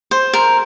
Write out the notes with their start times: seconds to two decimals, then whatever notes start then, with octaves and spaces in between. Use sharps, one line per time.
0.11 C5
0.33 A#4